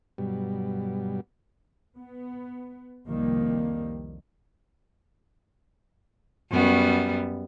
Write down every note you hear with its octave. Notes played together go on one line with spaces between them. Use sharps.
G2 B2 F#3 G3
B3
C2 F2 D#3 F3 G3 A#3
F#2 G3 B3